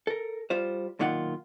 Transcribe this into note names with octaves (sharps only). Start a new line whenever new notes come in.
A4 A#4
G3 F4 C5
B1 A#2 D#3 F4 F#5